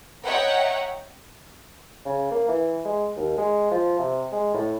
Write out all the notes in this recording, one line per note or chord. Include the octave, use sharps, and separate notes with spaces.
C#5 D#5 E5 F#5 G5 A#5
C#3
A#3
E3
G#3
D#2
G#3
F3
C3
G#3
A2